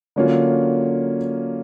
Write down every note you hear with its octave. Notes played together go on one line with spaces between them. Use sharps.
D3 F#3 A#3 C#4 F4